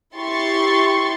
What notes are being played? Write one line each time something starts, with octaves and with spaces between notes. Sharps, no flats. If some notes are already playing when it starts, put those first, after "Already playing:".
E4 G4 C6 C#6 A6